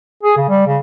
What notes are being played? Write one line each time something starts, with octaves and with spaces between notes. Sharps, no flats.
G#4
C#3
G3
C#3